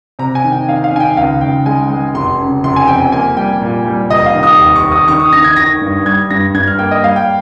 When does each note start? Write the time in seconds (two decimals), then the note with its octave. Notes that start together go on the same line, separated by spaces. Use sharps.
0.19 C3 A#5
0.35 G#5
0.44 D#3
0.52 G5
0.68 D#3 F5
0.84 F5
0.92 D#3 G#5
1.00 G5
1.16 C#2 F5
1.41 C#2 G5
1.66 G#3 G#5
1.90 G#3
2.15 F1 C6
2.39 C#3
2.64 F1 C6
2.76 G#5
2.88 F2 G5
3.00 G#5
3.12 A#3 G#5
3.36 G3 G5
3.61 A#2
3.86 G3
4.10 F1 D#5
4.26 F5
4.35 D#3
4.43 D#6
4.59 D#2
4.76 C#6
4.84 D#2
4.92 D#6
5.08 D#3 C#6
5.20 D#6
5.33 D#3 A#6
5.44 G#6
5.57 D#3 A#6
5.82 G2
6.06 G3 G#6
6.31 G2 A#6
6.54 G2 G#6
6.68 F6
6.79 A#3 G5
6.91 D#5
7.04 G3 F5
7.16 G5